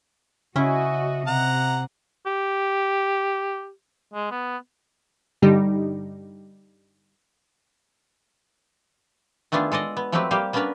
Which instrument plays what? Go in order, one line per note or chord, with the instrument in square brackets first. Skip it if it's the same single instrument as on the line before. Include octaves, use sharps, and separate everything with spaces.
[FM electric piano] C#3 [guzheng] C#4 E4 [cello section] F#4 D#5
[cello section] C3 [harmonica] F#5 A#5
[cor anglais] G4
G#3
B3
[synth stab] G2 D3 G3 D#4 G4
[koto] D#3 A3 B3 D4 F4 G#4
G#3 A4 D5 D#5
B3
F3 F#3 A3 C4 G4 B4
G3 A#3 G4 F5
A#3 B3 C#4 D4 A#4 B4